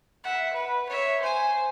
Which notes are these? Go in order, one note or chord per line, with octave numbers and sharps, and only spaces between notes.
E5 F#5
B4
C#5 E5
C5 G#5